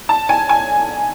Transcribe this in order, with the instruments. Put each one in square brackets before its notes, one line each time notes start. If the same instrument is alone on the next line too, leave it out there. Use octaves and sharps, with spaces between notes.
[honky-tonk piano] A5
G#5
G#5